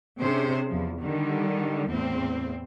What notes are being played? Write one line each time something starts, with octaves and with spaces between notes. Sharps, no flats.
C3 C#4 D4 G#4 C5
E2 F3
D3 D#3 G3
E2 A2 C4